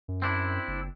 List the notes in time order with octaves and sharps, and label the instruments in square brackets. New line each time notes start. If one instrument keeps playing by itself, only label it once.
[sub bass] F#2
[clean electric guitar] C4 D4 E4
[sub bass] F#1